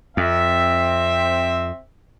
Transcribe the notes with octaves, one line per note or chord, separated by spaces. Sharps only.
F2 C4 E5